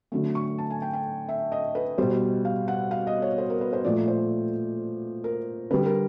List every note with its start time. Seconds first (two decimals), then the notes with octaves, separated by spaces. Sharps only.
0.12 D3 F#3 A3
0.35 C#6
0.58 A5
0.70 G#5
0.82 G5
0.93 G5
1.29 E5
1.52 D#5
1.75 B4
1.98 B2 G3 C5
2.45 F5
2.68 F#5
2.91 F5
3.07 D#5
3.22 C#5
3.38 C5
3.50 A#4
3.61 B4
3.73 C5
3.85 A#2 F3 A3 D5
4.08 C5
5.24 A#4
5.70 D3 B4
5.74 G3
5.86 A#4